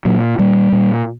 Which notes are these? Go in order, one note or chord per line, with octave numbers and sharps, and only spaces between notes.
A#2 F#3
A#2 G3
A#2